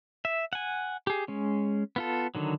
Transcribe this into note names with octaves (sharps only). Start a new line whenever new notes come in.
E5
F#5 G#5
G4 G#4
G#3 C#4
B3 F4 A4
D3 D#3 F#3